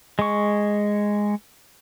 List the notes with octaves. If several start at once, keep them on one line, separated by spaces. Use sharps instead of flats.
G#3 C#6